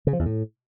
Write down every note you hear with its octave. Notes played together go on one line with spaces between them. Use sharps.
C#3
F3
E2
A2